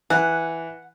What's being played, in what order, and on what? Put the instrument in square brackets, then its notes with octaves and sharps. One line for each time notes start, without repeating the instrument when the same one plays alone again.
[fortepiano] E3 [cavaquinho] F#5